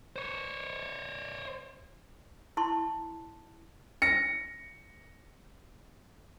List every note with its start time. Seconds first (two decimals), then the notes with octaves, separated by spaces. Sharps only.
0.16 C5 C#5
2.57 E4 A5 C6 C#6
4.02 A#6 C#7